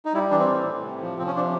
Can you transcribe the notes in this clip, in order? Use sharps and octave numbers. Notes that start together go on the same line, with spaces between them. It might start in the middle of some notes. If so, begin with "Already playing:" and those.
D#4
G3 E4
E3 D4
C4
A2
A2
C3
F3
F3 C4
C#4
C3 D4